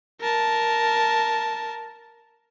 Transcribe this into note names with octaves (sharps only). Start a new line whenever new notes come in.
A#4 A5